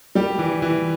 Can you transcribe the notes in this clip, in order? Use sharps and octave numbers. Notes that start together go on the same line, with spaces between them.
G3 G4
E3
E3